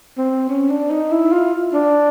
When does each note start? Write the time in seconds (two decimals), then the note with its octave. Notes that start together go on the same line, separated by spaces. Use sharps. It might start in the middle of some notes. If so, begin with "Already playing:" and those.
0.18 C4
0.49 C#4
0.70 D4
0.91 D#4
1.11 E4
1.32 F4
1.73 D4